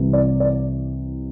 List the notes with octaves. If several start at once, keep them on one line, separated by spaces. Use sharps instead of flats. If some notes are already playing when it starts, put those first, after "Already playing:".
Already playing: C2 C3 E3
D5
D5